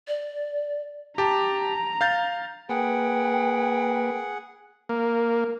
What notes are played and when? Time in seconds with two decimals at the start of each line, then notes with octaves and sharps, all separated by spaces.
0.08 D5
1.18 G4 A5 A#5
2.01 F5 G6 A6
2.69 A#3 G#4 B4 F#5 G5
4.89 A#3